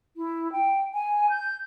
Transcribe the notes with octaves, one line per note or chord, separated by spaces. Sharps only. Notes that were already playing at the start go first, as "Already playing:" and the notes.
E4
G5
G#5
G6